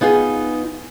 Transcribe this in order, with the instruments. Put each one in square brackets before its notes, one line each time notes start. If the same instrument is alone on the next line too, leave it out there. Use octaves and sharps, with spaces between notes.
[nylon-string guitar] B3 D#4 F4 G#4